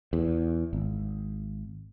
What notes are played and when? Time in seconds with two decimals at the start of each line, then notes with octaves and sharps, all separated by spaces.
0.13 E2
0.73 G#1